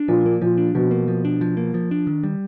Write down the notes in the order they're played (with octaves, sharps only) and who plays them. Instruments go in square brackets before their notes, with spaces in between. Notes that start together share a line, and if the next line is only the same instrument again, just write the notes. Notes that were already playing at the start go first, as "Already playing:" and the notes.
Already playing: [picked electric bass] D4
[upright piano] A#2 [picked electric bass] F3
[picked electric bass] A#3
[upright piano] A#2 [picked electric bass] F3
[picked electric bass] D4
[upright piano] B2 [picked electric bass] F3
[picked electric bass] A#3
F3
D4
F3
A#3
F3
D4
D#3
G3